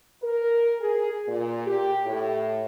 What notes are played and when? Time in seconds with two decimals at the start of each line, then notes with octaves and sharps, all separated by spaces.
0.22 A#4
0.81 G#4
1.28 A#2
1.66 G4
2.06 A2